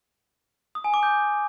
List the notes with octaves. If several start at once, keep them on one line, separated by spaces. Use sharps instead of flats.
D#6
G#5
D6
G6